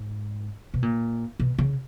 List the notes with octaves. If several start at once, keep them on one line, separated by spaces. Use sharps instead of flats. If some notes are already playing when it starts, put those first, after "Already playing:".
Already playing: G#2
B2
A#2
B2
C#3